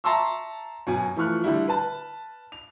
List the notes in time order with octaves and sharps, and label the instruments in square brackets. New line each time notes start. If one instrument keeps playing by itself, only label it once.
[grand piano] E5 A5 A#5 C6 C#6 E6
F#2 B2 G#5
E3 F3 A3 C#6 F6 F#6
D3 G3 E4
B4 A5
F7